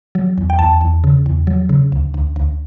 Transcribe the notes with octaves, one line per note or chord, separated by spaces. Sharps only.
F#3
E2
G5
E2 A5
E2
C#3
E2
F#3
C#3
D2
D2
D2